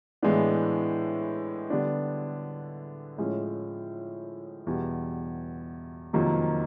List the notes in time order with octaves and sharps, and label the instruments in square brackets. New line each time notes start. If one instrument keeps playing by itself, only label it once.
[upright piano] A2 E3 G#3 B3 D4
D3 G3 B3 D4
A2 F3 G#3 C#4
E2 B2 G3
F2 C3 D#3 F#3 A#3